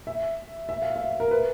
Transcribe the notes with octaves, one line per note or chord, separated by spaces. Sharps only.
E5
E5
F5
E5
A#4
B4